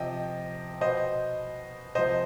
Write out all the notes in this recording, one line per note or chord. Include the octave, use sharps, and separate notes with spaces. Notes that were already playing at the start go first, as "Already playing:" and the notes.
Already playing: C3 F3 D#5 G5
B2 C5 D#5
C3 F3 C5 D#5